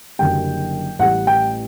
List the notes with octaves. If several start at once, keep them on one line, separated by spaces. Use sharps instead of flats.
F#1 F#2 D3 G3 G5
A1 A2 G3 F#5
G5